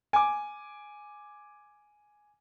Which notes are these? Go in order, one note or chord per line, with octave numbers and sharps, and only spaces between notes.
G#5 D6